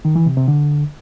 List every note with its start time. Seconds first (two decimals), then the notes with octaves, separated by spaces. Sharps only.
0.05 D#3
0.16 E3
0.26 C3
0.37 C3
0.48 D3